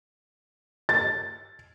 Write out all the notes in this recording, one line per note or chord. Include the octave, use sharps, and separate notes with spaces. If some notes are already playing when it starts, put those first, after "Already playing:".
A6